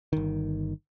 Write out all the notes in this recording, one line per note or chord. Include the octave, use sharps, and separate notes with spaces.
G1 D#3